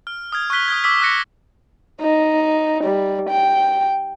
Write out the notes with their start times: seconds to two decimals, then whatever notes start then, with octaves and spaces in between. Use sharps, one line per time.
0.07 F6
0.32 D#6 F6 G#6
0.50 C#6 F6 F#6 B6 G7
0.68 D#6 F6 G#6
0.84 D6 E6 B6
1.01 D#6 F#6 A#6 C#7
2.01 D#4
2.84 G3
3.29 G5